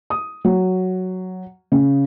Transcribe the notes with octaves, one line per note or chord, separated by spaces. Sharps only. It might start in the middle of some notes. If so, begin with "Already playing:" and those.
D#6
F#3
C#3